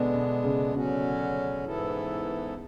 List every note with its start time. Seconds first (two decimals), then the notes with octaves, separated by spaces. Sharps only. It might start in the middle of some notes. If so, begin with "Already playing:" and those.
Already playing: B2 D3 G#3 B3 D4
0.14 B2
0.44 C#3
0.74 B2 D3 F#3 C#4 F#4
1.64 G#2 E3 B3 E4 A4